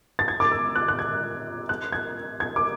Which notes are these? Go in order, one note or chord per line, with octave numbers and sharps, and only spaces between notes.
A6
G#6
D6
E6
F#6
F#6
G#6
F#6
G#6
G#6
D6